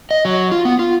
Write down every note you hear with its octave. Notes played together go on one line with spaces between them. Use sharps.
D#5
F#3
F4
B3
F4